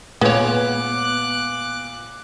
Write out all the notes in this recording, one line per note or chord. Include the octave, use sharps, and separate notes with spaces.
A#2 G#3 B3 C#5 D6 F#6 G#6